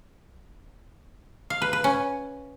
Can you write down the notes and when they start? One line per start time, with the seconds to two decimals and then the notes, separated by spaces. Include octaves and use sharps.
1.50 F5
1.62 B4
1.73 B4
1.84 C#4